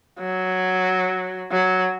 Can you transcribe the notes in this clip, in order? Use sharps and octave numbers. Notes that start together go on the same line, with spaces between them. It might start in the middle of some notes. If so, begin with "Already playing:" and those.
F#3
F#3